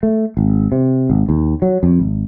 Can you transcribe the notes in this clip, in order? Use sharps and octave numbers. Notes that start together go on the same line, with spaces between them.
A3
G#1
C3
G#1
D#2
F#3
F2
G#1